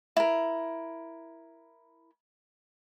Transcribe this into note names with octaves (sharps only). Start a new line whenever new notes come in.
E4 A#4